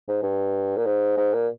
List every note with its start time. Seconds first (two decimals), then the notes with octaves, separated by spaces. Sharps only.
0.08 G#2
0.23 G2
0.77 A#2
0.86 G#2
1.17 G#2
1.33 A#2